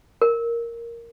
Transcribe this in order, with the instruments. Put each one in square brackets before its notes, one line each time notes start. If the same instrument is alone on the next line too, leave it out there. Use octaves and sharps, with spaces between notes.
[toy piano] A#4